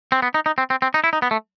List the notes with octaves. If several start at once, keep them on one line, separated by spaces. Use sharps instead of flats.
C4
B3
D#4
D#4
C4
C4
C4
D#4
E4
D#4
B3
A3